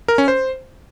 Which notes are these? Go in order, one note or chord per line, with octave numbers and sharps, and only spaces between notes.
A#4
C#4
C5